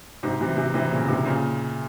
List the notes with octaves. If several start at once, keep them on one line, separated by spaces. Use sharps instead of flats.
G#2 C3
C3 E3
C3 E3
C3 E3
A#2 C#3
G#2 C3
A#2 C#3